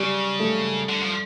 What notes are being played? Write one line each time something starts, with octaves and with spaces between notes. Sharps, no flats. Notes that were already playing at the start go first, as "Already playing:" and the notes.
Already playing: C#3 G3
A3
D3
F3